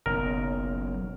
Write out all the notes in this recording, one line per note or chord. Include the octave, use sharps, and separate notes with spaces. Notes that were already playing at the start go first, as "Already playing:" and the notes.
F#1 B1 A#4